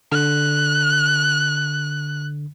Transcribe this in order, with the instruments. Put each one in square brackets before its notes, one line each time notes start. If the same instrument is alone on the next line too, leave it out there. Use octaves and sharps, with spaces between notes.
[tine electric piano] D3 [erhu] F#6